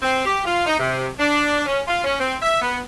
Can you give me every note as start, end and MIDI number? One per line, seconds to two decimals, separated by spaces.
0.02 0.22 60
0.26 0.42 67
0.45 0.66 65
0.67 0.76 63
0.80 1.08 48
1.19 1.64 62
1.67 1.81 61
1.88 2.04 65
2.04 2.19 61
2.20 2.35 60
2.42 2.59 76
2.62 2.79 59